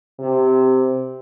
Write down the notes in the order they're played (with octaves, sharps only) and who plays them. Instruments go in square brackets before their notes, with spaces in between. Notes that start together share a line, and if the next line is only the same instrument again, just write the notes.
[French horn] C3